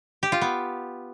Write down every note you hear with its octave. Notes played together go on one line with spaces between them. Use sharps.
G4
F4
B3